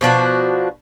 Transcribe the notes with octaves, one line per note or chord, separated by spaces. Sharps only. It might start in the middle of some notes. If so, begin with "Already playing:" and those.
B2 F3 D4 F#4